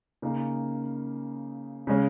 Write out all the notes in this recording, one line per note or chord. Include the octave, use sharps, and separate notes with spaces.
C#3 A#3 D#4
C#3 G#3 C#4